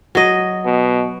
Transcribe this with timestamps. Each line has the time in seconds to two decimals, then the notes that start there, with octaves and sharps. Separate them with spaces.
0.15 F#3 D#5
0.65 B2